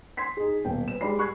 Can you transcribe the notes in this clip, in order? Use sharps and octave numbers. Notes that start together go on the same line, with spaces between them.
C6 G#6 B6 C7
D#4 G#4
D#1 B2 G5
B4 E7
G3 G#3 D5 B5 C7
C#6 F#6 G#6 C7